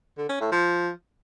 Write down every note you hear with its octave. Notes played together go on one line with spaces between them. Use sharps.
D3
C#4
A2
F3